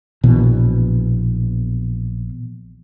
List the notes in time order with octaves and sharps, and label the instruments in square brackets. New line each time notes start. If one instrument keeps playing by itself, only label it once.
[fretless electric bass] A#1 B2 E3